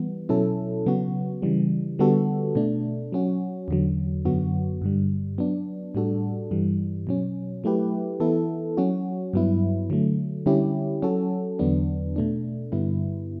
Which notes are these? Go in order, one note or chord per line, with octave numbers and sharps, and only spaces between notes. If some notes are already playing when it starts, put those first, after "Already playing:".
Already playing: E3 G3 B3
B2 F#3 C#4 E4 A4
C#3 F#3 B3 F#4
C#3 E3 G3
D3 G3 B3 F#4 A4
B2 A3 D4
F#3 C#4 F#4
E2 D3 F#3
F#2 D3 F#3 B3 F#4
G2 D3 G3
F#3 B3 D4
A2 G3 D4 F#4 A4
G2 E3 G3
B2 F#3 C#4
F#3 A3 E4 G4 B4
E3 B3 E4 A4
F#3 C#4 F#4
G2 F#3 B3 E4
D3 F#3 A3
D3 G3 C#4 E4 G4
F#3 C#4 F#4 A4
E2 D3 F#3 B3 D4
B2 A3 D4
G2 D3 G3 B3 E4